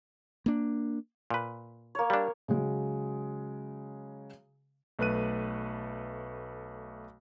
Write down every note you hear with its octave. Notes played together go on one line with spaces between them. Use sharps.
A#3 D4
A#2 B4
A#3 C#5
G3 D4
C#3 F#3 G#3
B1 A3 B4 F#6 D#7